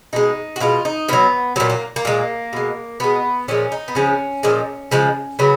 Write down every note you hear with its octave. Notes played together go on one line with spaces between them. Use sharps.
B2 G#3 D#4
F#4
B2 G#3 F4
D#4
B2 F#3 B3
A#2 F#3 B3
A#3
A#3
A#2 G#3
B2 G#3
B2 G#3 B3
A#2 F3 G#3 C#4
D#4
B3
C#3 F3 G#3 C#4
A#2 F3 G#3
C#3 F3 G#3
C#3 F#3 B3